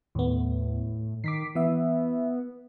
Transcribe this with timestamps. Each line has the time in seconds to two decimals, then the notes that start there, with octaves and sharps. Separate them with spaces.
0.15 D#2 A2 B3
1.24 D#3 D6 B6 C7
1.55 E3 B3 E5